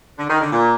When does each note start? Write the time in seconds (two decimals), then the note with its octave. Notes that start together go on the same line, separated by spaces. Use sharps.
0.18 D3
0.30 D#3
0.41 D3
0.52 A#2